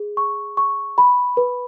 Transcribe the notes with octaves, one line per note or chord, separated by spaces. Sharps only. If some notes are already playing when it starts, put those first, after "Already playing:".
Already playing: G#4
C#6
C#6
B5
B4